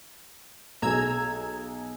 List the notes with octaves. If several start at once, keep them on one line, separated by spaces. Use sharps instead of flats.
B1 G#4 A#5 E6 G#6